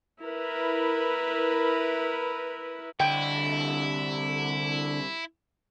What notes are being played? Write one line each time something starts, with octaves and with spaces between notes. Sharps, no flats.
E4 A#4 B4
C2 D3 E4 D#5 G5